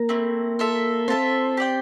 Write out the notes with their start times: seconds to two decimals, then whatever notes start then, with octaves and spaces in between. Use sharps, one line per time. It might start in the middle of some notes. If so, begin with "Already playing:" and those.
Already playing: A#3 A#4
0.09 A3 C4 E4
0.59 F4 A4 E5
1.08 C4 F4 A4 C5 E5
1.57 G4 D5 G5